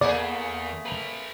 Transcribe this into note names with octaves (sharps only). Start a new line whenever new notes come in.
E2 A3 A#3 G#4 D5
B4 A#5